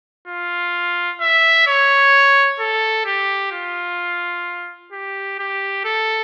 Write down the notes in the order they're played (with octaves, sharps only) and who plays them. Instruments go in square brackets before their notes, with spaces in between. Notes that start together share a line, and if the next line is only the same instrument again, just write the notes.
[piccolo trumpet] F4
E5
C#5
A4
G4
F4
G4
G4
A4